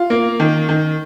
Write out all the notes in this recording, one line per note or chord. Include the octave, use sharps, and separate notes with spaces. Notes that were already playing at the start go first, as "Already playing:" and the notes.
Already playing: F4
A#3
D#3
D#3